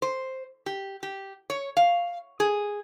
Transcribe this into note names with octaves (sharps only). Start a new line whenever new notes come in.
C5
G4
G4
C#5
F5
G#4